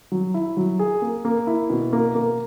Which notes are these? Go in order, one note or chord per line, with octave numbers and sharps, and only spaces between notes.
F#3
E4
F#3
G#4
A#3
A#3
E4
B2
A#3
A#3